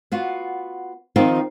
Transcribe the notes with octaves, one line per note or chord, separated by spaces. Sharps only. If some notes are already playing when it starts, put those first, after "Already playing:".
B3 F4 F#4
D#3 F3 C4 D#4 F4